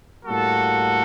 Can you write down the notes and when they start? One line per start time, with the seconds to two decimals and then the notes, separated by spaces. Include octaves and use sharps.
0.25 A2 G3 A#3 F#4 A4